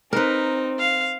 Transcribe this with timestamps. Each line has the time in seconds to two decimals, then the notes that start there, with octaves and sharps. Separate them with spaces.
0.13 C4 D#4 A#4 B4
0.79 F5